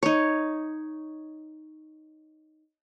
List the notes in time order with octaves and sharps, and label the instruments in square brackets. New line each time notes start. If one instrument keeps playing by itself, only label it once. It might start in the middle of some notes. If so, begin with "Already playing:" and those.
[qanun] D#4 C#5